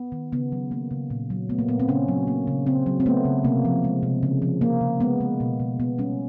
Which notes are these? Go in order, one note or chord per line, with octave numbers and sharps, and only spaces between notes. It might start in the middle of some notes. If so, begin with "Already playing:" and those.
Already playing: B3
D#3
C#3 B3
F#3
A#3
C#3
A#2
F#3
A3 B3
A#3
A#2 B3
C4
C#3 C#4
F#3
A#3
C#3
C#3 C4
F#3
C4
A3 B3
C#3
C3 A#3
F3
G#3
C3
C#3
F3
A#3
C#3
G#3 B3
G#3
B2
B2
B2 B3
G3 C#4